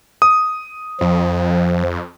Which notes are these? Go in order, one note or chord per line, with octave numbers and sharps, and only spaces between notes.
D#6
F2 F3